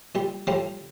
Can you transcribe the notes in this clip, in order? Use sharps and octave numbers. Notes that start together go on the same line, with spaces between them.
A#2 G3
A2 F3 G3 F4